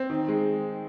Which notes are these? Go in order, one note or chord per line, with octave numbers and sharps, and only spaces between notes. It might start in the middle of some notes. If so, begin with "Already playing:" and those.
Already playing: C4
D#3
G#3